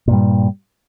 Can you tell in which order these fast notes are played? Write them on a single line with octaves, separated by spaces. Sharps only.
A#2 G2 G3